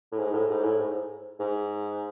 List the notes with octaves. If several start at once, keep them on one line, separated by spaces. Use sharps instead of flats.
A2
G#2
A2
G#2
A2
G#2
G#2